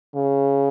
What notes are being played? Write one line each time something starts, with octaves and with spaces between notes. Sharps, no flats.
C#3